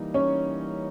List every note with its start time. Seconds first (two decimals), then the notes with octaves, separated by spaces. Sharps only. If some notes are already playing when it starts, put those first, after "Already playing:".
Already playing: E3 G3 A#3 D#4
0.14 C#4 C#5